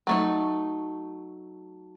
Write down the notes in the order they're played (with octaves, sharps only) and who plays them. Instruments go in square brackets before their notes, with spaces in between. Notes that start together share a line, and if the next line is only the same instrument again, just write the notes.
[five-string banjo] F#3 A3 D#4